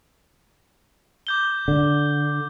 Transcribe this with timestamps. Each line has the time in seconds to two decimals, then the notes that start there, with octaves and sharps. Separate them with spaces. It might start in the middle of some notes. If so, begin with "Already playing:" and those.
1.27 D6 G6 G7
1.68 D3